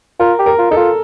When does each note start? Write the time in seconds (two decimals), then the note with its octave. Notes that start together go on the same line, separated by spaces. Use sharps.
0.20 F4 A#4
0.39 G4
0.46 A#4
0.59 F4
0.71 D#4 A4
0.77 F4